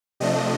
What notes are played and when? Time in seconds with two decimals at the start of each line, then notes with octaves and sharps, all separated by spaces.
0.20 C3 F3 A3 D4 D#5